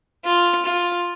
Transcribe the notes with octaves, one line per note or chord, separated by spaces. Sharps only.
F4
F4